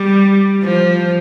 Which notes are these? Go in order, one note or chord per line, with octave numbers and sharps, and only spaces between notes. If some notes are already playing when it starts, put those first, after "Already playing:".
Already playing: G3
F3